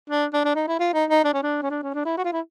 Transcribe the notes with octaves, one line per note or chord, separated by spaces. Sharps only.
D4
D4
D4
D#4
E4
F4
D#4
D#4
D4
C#4
D4
C#4
D4
C#4
D4
E4
F#4
F4
E4